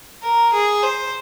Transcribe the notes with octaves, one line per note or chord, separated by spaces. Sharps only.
A#4
G#4
C5